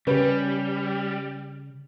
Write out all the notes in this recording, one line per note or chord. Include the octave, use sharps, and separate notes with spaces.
C#3 G3 C#4 G4 B4